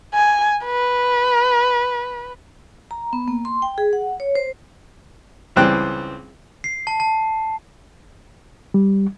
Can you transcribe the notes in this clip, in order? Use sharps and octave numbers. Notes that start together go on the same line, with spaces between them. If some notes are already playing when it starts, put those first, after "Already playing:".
G#5
B4
A#5
B3
A#3
C6
G5
G#4
F#5
C#5
C5
C#2 E3 G3 C4 G5 F#6
C7
A5
A5
G3